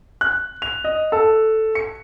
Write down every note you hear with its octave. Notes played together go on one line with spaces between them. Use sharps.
F#6
F7
D#5
A4
C#7